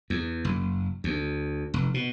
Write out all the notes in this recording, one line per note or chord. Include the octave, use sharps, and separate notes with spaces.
E2
F#1
D2
F1
B2